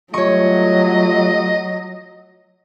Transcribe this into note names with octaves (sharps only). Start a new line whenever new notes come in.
F#3 G3 A3 F4 C#5 D#5 C#6